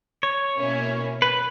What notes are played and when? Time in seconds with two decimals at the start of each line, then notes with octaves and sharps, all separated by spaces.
0.23 C#5
0.56 B2 A#3 C#4 E4
1.22 B4